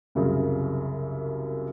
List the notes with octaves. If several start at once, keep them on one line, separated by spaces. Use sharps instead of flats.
C2 F#2 C#3